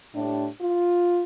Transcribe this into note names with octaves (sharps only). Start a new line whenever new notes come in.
A2 G3 D4
F4